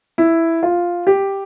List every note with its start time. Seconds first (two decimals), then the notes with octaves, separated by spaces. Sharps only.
0.18 E4
0.63 F4
1.07 G4